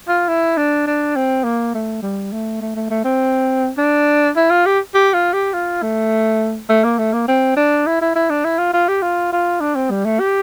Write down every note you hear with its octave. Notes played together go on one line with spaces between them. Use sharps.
F4
E4
D4
D4
C4
A#3
A3
G3
A3
A3
A3
A3
C4
D4
E4
F4
G4
G4
F4
G4
F4
A3
A3
A#3
A3
A#3
C4
D4
E4
E4
E4
D4
E4
F4
F4
G4
F4
F4
D4
C4
G3
A3
G4